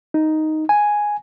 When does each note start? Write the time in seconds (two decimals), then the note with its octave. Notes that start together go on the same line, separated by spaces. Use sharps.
0.14 D#4
0.69 G#5